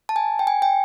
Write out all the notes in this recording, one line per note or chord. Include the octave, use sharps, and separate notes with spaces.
A5
G#5
G5
G#5
G5